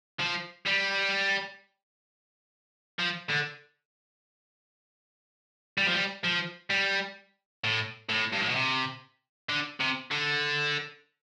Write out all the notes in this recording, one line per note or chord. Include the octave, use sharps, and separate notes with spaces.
F3
G3
F3
D3
G3
F3
G3
F3
G3
A2
A2
G2
A2
B2
C3
D3
C3
D3